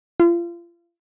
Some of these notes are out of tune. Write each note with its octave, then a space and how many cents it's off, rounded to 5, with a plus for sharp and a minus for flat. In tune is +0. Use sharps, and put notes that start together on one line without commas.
F4 -35